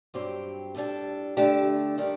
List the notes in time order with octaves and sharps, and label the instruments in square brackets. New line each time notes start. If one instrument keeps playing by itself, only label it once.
[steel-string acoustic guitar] G2 F#3 C4 G4
A2 G3 D4 A4
D3 A3 D4 G4
D#3 G3 D4 G4